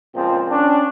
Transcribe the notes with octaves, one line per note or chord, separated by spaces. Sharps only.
C#2 A#2 F3 C4
C#4 D4